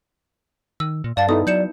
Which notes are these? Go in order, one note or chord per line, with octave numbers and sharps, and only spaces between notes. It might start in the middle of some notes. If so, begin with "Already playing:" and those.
D#3 E6
A#2
G2 D5 F5 A5 A6
B3 D#4 E4 A4 D#6
F#3 D5 G6 C#7 E7